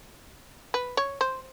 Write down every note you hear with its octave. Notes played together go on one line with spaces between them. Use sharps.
B4
C#5
C5